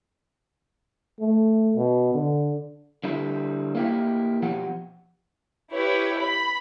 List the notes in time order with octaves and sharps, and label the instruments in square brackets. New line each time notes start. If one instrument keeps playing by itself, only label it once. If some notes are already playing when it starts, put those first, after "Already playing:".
[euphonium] A3
B2
D3
[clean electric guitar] D3 G3 E4
A#3 E4 G4
B2 F3 G4 F#5
[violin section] E4 G4 B4 C#5
B5